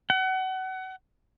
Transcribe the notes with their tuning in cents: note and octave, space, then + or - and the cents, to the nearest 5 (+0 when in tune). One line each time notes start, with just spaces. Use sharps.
F#5 +30